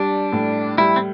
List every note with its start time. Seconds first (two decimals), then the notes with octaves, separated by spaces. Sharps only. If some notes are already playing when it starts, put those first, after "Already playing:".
Already playing: G3 D4
0.32 A2
0.78 G3 E4
0.96 C4